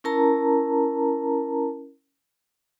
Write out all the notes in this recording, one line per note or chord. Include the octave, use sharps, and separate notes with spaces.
C#4 E4 A#4 A5 A#5